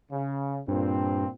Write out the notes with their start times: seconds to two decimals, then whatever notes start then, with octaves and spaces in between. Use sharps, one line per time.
0.12 C#3
0.68 G2 A#2 C4